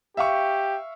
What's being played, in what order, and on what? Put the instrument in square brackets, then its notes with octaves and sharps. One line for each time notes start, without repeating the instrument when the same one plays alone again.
[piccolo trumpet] G4 [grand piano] E5 F5 C#6